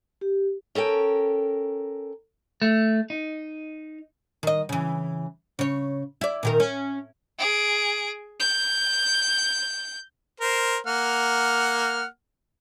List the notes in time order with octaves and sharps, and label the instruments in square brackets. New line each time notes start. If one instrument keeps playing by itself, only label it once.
[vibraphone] G4
[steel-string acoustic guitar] C#4 A4 A#4 G5
[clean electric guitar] A3
D#4
[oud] D#3 D#5
C#3 E3
C#3 C#5
E4 D5
A#2 D#3 A#4
C#4
[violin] G#4 D7
G6
[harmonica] A#4 C5
A#3 F#5 F6